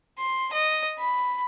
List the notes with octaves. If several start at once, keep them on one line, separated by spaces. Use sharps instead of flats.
C6
D#5
B5